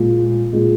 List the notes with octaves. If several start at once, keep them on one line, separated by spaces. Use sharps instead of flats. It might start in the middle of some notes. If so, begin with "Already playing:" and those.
Already playing: A#2 G#3
A#2 G#3